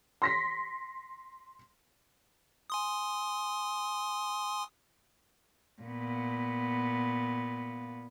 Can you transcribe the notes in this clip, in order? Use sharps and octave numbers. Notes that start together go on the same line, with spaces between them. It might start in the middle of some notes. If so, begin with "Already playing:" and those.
C6 A#6 B6
G#5 C6 D#6
A#2 B3